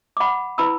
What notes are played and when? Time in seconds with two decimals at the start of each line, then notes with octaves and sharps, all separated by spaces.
0.17 D6
0.20 F#5 B5
0.58 E4 B4 B5 E6